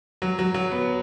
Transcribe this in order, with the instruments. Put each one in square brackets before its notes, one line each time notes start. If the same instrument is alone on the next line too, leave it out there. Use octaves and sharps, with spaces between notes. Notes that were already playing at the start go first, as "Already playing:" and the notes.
[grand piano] F#3
F#3
F#3
B3